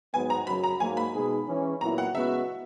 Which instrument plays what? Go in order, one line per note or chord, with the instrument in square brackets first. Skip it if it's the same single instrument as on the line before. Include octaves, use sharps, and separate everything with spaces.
[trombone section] G#2 F#3 B3 [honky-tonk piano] G#5
[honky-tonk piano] A#5
[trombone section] F#2 C#3 F#3 [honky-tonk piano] B5
[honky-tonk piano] A#5
[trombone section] G#2 F#3 A#3 [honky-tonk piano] G#5
[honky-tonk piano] B5
[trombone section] B2 G#3 D#4 G#4
E3 G#3 C#4
[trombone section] A#2 F#3 B3 E4 [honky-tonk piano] A#5
[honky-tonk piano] F#5
[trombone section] C#3 G#3 B3 F#4 [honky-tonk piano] E5